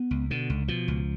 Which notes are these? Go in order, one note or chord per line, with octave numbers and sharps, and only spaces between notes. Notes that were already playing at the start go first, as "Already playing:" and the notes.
Already playing: B3
C#2
B2 D3
C#2
B2 F3
C#2